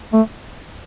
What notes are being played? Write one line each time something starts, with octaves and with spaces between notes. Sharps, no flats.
A3